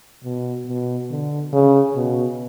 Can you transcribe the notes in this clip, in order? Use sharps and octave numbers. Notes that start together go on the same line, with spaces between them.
B2
B2
D3
C#3
B2